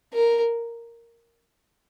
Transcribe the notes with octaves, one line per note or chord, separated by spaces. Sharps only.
A#4